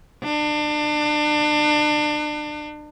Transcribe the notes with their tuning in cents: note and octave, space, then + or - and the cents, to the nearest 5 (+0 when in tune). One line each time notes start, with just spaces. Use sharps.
D4 +30